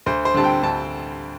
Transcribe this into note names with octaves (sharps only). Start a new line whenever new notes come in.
D2 C5
C5
D3 G3 C4 A5
G5
D2 A5